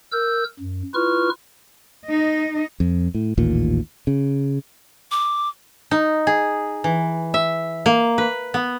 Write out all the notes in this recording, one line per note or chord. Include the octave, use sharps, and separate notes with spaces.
A#4 E6 G6
F#2
E4 F4 B4 C#6 F6
D#4 D#5
F2
A2
A1 D#2 A#2
C#3
D6
D#4
G#4
E3
E5
A#3
B4
B3